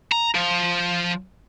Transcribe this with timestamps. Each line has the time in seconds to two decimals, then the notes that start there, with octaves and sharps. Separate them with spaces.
0.12 A#5
0.35 F3